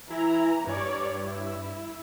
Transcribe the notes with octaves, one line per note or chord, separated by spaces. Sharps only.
E3 E4 A#5
G2 C#5 D5
E4